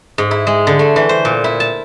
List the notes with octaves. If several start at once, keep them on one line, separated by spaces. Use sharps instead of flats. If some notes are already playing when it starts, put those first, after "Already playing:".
G#2
E4
G#3
D3
A3
E3
C5
A#2
E4
A5